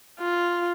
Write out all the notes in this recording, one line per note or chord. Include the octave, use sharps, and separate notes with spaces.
F4